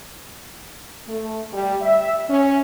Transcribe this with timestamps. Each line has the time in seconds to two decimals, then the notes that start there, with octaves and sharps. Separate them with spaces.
1.07 A3
1.53 G3
1.81 E5
2.29 C#4